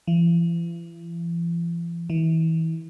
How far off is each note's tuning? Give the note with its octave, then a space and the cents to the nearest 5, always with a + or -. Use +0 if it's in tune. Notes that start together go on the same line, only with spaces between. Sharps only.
E3 +45
E3 -30